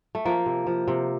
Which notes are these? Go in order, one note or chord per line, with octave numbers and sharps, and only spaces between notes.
A3
F3 A#3
C3
F3
C3